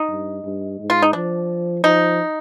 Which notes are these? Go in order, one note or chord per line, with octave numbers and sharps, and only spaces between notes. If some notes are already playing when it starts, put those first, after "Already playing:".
Already playing: D#4
G2
G2
G#2
F4
D#4
F3 D4
F3 D#4